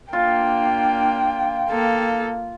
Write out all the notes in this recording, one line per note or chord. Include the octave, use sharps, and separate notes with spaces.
A#3 D4 F4 G5
A#3 A4